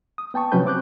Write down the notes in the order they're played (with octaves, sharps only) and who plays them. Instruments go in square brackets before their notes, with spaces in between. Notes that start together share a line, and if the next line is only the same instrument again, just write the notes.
[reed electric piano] D#6
B3 G5 A5 C#6
C3 F3 F#3 C#4 B4 G6
C4 D6 F#6 G6